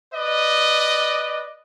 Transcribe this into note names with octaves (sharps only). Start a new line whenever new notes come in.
B4 D5 D#5